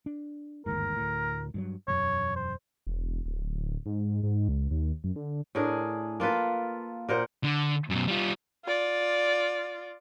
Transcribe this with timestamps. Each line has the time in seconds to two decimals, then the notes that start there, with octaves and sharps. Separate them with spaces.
0.06 D4
0.66 G1 D#2 G#2 A#4
0.97 D2 A2
1.54 G2 D#3 F#3
1.88 E1 F#2 C#5
2.36 C5
2.87 E1
3.26 D1
3.86 G#2
4.23 G#2
4.49 C#2
4.71 D#2
5.04 F#2
5.16 D3
5.55 A2 D4 G#4 A#4
6.20 A#3 F4 A4 B4
7.09 A#2 A#4 C5 F#5
7.44 D3
7.90 F#2 B2
8.08 G3 F4
8.65 F4 D5